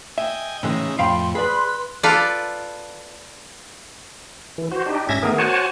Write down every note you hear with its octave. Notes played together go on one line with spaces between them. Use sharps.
D#5 E5 G5 G#5
A2 C#3 E3 G#3 D#4 E4
F2 A2 F5 G5 B5 C6
G#4 B4 D5 B5
F4 A4 B4 D5
E3
F#4 C5
D4 D#4 G4
G#2 C#4 E5 G#6 A#6
D#3 A3 B3 G#4 A#4
F#4 C5 C#5 F#5 G#5 A5